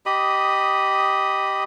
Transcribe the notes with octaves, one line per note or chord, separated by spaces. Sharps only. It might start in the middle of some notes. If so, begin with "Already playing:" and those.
G4 D#5 B5 D#6